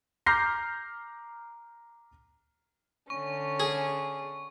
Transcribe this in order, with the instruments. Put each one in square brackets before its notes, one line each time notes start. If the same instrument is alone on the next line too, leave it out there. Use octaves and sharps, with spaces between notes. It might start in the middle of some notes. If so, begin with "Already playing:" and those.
[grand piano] A#5 D6 F6 G6 A#6 C7
[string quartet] D3 C#4 [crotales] C#6
[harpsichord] G#4